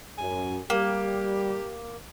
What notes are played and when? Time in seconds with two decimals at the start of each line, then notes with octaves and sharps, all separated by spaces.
0.18 F#2 G#5
0.70 G3 A#3 G4